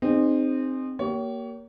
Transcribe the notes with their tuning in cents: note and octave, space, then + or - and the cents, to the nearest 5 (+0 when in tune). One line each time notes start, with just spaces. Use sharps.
C4 +0 D#4 -25 G#4 -20
A#3 +0 G4 -30 C#5 +25